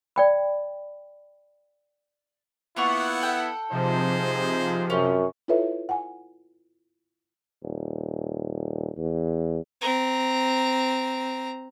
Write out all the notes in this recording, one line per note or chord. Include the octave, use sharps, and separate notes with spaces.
D5 G5 B5
A#3 B3 E4 F4 F#5 C#6
A4 G5
C3 F3 D#4 G#4 C5
F#2 C#4
E4 F4 A4 B4 C#5 E5
F#5 G#5
D#1
E2
C4 A#5